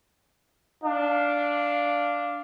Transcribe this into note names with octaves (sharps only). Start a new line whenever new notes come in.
D4 F5